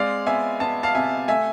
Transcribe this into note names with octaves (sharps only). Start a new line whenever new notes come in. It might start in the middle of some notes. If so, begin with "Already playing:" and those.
Already playing: G#3 C4 D5 F5
B3 E5 G#5
B3 A5
F5 A5
C3 E5 G#5
A3 E5 G#5